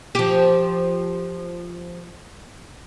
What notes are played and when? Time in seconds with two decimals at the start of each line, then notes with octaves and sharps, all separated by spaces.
0.15 F3 G4